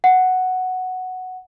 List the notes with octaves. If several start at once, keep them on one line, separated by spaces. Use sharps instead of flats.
F#5